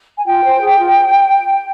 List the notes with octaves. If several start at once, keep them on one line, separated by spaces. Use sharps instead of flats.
G#5
F4 G5
C5
G#4
F4